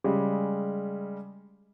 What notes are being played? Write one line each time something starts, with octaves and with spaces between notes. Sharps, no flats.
C#3 G3 G#3